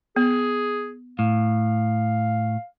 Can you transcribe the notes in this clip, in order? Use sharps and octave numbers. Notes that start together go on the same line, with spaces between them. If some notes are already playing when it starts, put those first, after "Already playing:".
B3 G#4
A2 F5